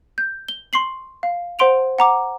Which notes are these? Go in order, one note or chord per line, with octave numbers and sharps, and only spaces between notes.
G6
G7
C6 C#6 C7 F#7
F5
C5 F#5 C6 D7 F7
F#5 A#5 D6